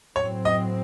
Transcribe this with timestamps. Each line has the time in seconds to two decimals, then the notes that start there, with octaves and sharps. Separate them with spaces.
0.16 A2 F#3 C4 C#5
0.45 D#5